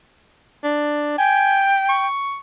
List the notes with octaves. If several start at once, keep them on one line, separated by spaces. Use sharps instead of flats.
D4
G5 G#5
C#6